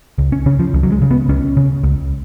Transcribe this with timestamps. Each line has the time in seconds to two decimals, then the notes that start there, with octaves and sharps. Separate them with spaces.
0.18 C#2
0.32 C#4
0.46 C#3 C#4
0.59 F3
0.74 C#2
0.83 F#3
0.92 G#3
1.02 C#3
1.11 B3
1.29 C#2 C#4
1.57 C#3
1.83 C#2